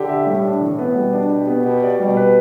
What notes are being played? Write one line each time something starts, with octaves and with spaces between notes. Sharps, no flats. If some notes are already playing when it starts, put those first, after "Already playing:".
Already playing: D3 G4
E5
A2 G3
D4
E3
B3
B2 G3
D4
G4
B3
B2 G4
D5
B2 G3
B4